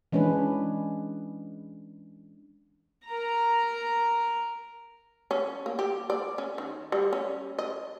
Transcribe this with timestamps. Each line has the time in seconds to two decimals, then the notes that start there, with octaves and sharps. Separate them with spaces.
0.12 E3 G#3 C#4 D4 B4
3.07 A#4 A#5
5.31 C#4
5.66 A#3
5.79 G4
6.10 D5
6.38 C#4
6.58 D#3
6.92 G3
7.13 C#4
7.59 D#5